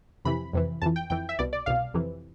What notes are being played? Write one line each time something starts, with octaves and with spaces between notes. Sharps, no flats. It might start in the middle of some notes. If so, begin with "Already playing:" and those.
F2 C3 E3 B5
F2 C3 E3
F2 E3 A5
G5
F2 E3 G5
E5
C2 B2 D5
D5
C2 B2 F5
F2 C3 E3